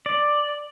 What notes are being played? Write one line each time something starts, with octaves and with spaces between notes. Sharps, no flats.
D5